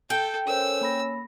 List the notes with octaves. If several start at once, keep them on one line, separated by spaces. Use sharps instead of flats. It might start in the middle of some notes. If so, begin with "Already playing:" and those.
A4 G5
C#4 A4 A#4 C5 E6
A#3 B5 A#6